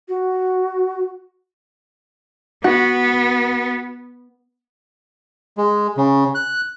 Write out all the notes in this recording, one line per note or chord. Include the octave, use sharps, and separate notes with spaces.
F#4
B3 F#4
G#3
C#3
F#6